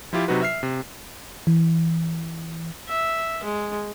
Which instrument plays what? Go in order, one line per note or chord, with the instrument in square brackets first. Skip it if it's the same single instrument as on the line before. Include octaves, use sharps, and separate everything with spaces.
[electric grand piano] F3 E4 F4 G4
C3 F#3 D#4 F#4 B4
E5 F6 C7
C3
[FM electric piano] E3
[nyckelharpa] E5
G#3